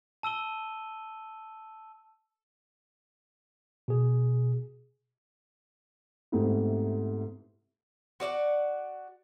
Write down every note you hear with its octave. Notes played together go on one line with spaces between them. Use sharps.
A5 E6 D#7 G7
B2 G#4
G#2 C3 A3 B3 D#4 E4
F#4 D5 E5 F#5